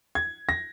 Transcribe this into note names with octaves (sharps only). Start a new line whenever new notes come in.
G#6
A#6